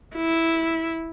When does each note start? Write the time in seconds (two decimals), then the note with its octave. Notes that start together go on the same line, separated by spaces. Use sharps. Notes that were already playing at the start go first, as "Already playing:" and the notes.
0.15 E4